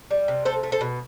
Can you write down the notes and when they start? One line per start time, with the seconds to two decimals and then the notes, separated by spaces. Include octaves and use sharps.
0.11 G3
0.28 C3
0.45 A3 A4 C5
0.63 A3
0.72 A4 C5
0.81 B2